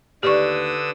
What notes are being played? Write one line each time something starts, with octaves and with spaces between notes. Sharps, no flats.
D#2 D3 G4 B4 D5 C#6 D#6 E6